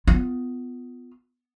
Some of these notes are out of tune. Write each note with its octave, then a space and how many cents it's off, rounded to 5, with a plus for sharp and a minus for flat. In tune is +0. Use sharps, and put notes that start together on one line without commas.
B3 +20 F4 +0